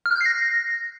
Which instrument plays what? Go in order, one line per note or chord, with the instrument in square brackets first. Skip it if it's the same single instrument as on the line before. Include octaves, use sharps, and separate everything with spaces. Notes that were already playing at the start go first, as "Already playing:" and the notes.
[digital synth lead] F6
F#6
G6
C7
A#6